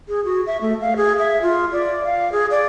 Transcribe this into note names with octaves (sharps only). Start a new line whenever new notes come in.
G#4
F#4
E5
A3
F5
G#4
E5
F4
D5
F5
G#4
D5